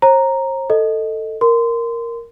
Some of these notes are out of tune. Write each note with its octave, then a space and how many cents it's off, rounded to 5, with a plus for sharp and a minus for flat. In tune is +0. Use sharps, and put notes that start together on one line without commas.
C5 +45 A#5 +0
A4 +10 D#5 +0
A#4 +0 C6 -25